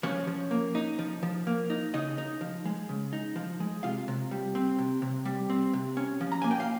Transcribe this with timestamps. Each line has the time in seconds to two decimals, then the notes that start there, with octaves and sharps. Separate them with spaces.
0.03 F3 C#4 C#5
0.27 F3
0.51 A#3
0.75 D#4
0.99 F3
1.23 F3
1.47 A#3
1.70 D#4
1.94 C#3 D#4 D#5
2.18 D#4
2.41 F3
2.65 G#3
2.89 C#3
3.13 D#4
3.36 F3
3.60 G#3
3.83 C3 F4 F5
4.08 C3
4.31 G3
4.55 C4
4.79 C3
5.02 C3
5.25 G3
5.50 C4
5.73 C3
5.97 C#4
6.21 F3
6.32 A#5
6.42 A#3 G#5
6.51 G5
6.60 F5